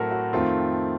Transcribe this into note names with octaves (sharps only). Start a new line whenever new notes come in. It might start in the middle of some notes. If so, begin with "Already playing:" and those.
Already playing: A2 F#3 A3 C4 F#4 A4 A#4
F#4
F2 D#3 A3 C4 F4